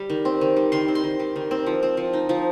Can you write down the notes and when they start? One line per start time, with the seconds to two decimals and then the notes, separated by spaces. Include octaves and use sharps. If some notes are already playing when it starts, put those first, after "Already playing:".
Already playing: G3
0.10 D#3
0.25 C4
0.41 D#3
0.56 G3
0.72 D#3 C6
0.88 C4
0.95 C6
1.04 D#3
1.20 G3
1.36 D#3
1.51 C4
1.66 F3
1.83 C4
1.97 F3
2.13 D#4
2.29 F3